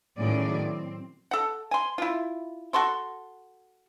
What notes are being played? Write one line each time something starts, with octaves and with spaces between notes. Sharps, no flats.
A2 D#3 F#3 C#4 G#4 D5
C4
A4 F#5
G#5 C6
E4 F4
F#4 A4 C6 C#6